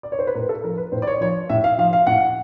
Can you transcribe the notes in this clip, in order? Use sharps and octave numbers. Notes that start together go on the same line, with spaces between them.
D5
C#5
C5
B4
A2 A#4
A4
F3 A#4
B4
A2 C5
D5
C#5
F3 C#5
A2 E5
F5
F3 F5
F5
A2 F#5